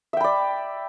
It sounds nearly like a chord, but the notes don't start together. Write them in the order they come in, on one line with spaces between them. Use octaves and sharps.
E5 G5 B5 D5